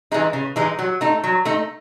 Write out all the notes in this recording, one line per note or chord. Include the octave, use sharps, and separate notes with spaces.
E3 G#3 D#4
C#3
E3 G#3 D#4
F#3
A3 D#4
F#3
A3 D#4